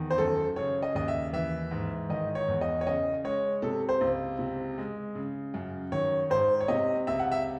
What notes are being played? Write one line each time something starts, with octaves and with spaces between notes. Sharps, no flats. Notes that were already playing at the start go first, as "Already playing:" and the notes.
Already playing: E2 D#3
C5
F#2 A4
C#3 C#5
D#5
D#2 D#5
E5
E3 E5
G#2
D#3 D#5
C#5
E2
D#5
C#5
C#3 D#5
G#3 C#5
C3 A4
C5
C#2
C3
G#3
C#3
F#2
D#3 C#5
G#2 C5
C#5
C3 D#5
C#2 E5
F#5
E5